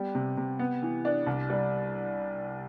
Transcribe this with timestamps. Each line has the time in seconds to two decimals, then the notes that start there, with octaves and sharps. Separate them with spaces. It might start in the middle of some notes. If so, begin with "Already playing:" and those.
Already playing: G3 B3 G4
0.15 C3
0.37 C3
0.59 B3
0.82 E3
1.05 D4
1.27 C2
1.50 G3